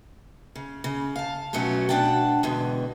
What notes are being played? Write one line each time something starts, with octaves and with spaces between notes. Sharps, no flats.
C#3
C#3
F5 A5
F2 B2 F#3 A3 C#4 F#4
B2 B3 D4 F#5 G5 A5
E2 G#2 B2 D3